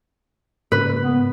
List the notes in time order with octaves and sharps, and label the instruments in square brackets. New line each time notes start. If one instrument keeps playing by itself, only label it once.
[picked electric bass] G#2 C#3 A#3 [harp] B4
[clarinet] B3